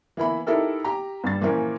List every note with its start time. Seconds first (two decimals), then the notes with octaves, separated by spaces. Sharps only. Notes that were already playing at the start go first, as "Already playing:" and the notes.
0.17 E3 A#3 B3 E4 E5 B5
0.47 D#4 E4 G4 A4 A#4 E5
0.84 G4 A#5
1.24 G2 G3 A6
1.41 A#2 E3 F3 A#3 C#4 A#4